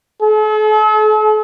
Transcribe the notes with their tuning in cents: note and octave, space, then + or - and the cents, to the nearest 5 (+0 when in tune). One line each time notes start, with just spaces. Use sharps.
A4 -45